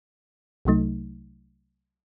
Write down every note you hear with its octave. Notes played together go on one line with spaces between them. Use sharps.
C2 C3 F#3 A3 D#4